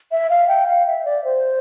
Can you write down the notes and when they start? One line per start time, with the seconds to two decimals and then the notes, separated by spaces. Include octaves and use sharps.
0.12 E5
0.30 F5
0.48 G5
0.67 F5
0.86 E5
1.05 D5
1.24 C5